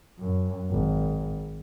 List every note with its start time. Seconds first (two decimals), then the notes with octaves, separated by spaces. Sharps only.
0.19 F#2
0.70 G#1